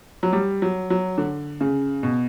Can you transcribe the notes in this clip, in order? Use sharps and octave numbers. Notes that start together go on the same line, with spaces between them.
F#3
G3
F#3
F#3
D3
C#3
B2